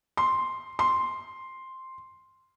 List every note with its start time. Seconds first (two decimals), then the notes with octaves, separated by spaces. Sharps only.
0.17 C6
0.79 C6